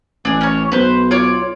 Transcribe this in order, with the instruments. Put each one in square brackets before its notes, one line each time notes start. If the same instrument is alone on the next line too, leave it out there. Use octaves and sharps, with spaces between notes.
[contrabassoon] A1 [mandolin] D4 G#4
[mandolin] C#4 C#5
[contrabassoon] B1 [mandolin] B4 C5
[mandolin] F4 C#5 D5